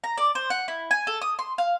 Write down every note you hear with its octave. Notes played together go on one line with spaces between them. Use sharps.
A#5
D5
C5
F#5
E4
G#5
A4
D#6
C6
F5